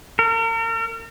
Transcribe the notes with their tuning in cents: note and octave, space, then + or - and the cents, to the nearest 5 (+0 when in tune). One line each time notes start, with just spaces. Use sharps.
A#4 -40